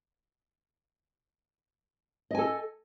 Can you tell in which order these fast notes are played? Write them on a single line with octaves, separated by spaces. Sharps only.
D#5 G#5 A4